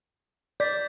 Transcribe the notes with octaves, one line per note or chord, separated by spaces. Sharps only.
D5 G6 B6